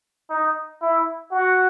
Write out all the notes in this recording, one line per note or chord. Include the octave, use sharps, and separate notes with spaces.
D#4
E4
F#4